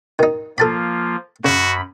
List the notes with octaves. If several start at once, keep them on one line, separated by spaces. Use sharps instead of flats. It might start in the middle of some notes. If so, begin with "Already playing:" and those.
D#3 D#4
F3 A#3 F4 A4 A5 B5
F#2 C#3 F#4 B5